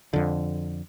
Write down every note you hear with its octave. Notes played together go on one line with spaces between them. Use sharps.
F2 D3